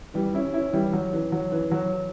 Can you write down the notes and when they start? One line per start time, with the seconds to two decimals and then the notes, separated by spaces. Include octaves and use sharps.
0.14 E3 G3
0.34 C#4 E4
0.54 C#4 E4
0.73 E3 G3
0.93 F#3
1.13 E3
1.32 F#3
1.52 E3
1.71 F#3